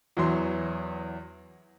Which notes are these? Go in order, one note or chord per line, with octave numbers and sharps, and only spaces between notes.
E2 E3 F#3 C6